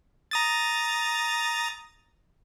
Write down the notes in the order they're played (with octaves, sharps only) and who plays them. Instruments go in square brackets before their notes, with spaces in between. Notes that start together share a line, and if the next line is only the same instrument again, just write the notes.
[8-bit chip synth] A#5 D#6 A6